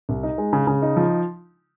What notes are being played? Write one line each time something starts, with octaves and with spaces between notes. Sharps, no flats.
C2
D#4
G#3
C#3
C#3
D#4
F3